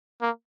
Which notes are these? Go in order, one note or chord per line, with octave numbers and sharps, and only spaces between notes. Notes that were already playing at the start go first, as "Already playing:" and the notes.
A#3